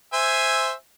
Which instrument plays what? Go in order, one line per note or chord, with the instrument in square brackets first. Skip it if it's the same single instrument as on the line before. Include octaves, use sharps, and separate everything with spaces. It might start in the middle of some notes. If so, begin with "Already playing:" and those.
[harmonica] C5 E5 G#5